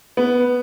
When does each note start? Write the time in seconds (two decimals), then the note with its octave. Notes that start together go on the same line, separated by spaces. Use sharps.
0.17 B3